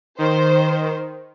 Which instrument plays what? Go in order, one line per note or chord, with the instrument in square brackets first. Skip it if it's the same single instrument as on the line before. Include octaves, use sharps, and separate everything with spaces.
[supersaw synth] D#3 [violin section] C5